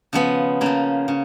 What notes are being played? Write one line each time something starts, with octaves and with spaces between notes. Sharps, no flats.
C#3 F3 B3
C#3 F3 A#3
C#3